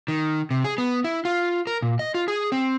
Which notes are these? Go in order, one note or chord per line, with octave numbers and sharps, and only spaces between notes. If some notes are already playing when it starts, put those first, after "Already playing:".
D#3
C3
G#4
B3
E4
F4
A#4
A#2
D#5
F4
G#4
C4